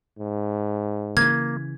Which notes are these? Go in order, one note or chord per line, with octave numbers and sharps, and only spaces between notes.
G#2
C#3 E3 A#3 G#6